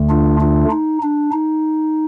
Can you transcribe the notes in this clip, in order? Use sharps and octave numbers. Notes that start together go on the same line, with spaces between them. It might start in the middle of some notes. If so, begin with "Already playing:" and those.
Already playing: D2 D3 A3
D4 F4
D4 F4
D#4
D4
D#4